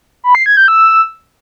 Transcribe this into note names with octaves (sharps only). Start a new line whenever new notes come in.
B5
C7
G#6
G6
E6